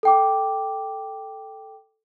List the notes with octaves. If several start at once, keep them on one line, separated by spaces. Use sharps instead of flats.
A4 G5 D6